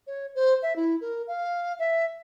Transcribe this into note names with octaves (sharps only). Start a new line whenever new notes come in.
C#5
C5
E5
E4
A#4
F5
E5